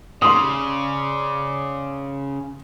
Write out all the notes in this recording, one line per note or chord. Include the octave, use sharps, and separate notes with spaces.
C#3 D5 C6 D#6